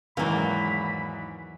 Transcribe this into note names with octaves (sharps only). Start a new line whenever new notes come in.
E2 G#2 D#3 E3 F#3 A#3 E4 B5